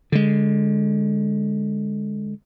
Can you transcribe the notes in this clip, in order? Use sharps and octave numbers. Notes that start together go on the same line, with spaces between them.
D3 G#3